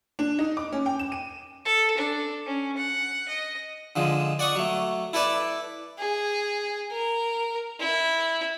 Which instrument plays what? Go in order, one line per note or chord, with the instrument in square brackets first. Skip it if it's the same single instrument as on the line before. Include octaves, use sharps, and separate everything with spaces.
[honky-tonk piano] D4
D#4
D6
C#4
G5
E7
D#7
[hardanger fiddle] A4
D4
C#4
F#5
D#5
[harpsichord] D3 F3 G#3
D5 F#5 C#6 D#6
F#3 A3
E4 A4 B4 D5 A5
[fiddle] G#4
A#4
E4